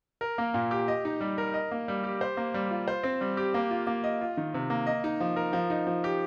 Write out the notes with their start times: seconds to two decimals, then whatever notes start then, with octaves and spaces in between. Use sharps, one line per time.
0.21 A#4
0.38 A#3
0.54 A#2
0.71 G4
0.88 D#5
1.05 D#4
1.21 G3
1.38 A#4
1.54 D#5
1.71 A#3
1.88 G3
2.04 G4
2.21 C5
2.37 A#3
2.54 G3
2.71 F4
2.88 C5
3.03 C4
3.21 G3
3.37 G4
3.54 A#3
3.71 F4
3.87 A#3
4.04 D#5
4.21 F4
4.37 D#3
4.54 C3
4.70 A#3
4.87 D#5
5.04 D#4
5.20 F3
5.36 A#4
5.53 F3
5.70 D#4
5.87 F3
6.04 G4